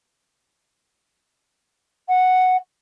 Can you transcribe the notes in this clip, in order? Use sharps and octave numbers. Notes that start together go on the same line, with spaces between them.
F#5